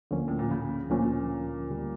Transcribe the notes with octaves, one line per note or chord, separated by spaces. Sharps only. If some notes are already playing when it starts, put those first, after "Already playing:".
D2 D3 F3 A#3 C#4
A2
A#2
C#3
D2 A#2 D3 F3 A#3 C#4
D2 C#3 G3